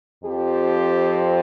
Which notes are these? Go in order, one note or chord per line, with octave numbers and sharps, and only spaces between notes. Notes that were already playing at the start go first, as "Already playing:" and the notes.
F2 F3 C4 G4